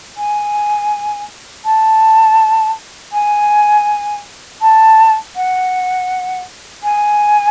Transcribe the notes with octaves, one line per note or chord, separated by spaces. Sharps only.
G#5
A5
G#5
A5
F#5
G#5